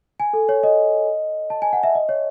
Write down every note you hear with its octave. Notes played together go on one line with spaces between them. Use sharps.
G#5
A4
C#5
D#5
A5
G#5
F#5
E5
D#5
C#5